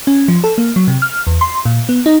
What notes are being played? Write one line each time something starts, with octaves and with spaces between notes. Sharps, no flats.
C#4
F3
A4
A#3
F#3
C3
F6
E2
C6
A#2
B3
D#4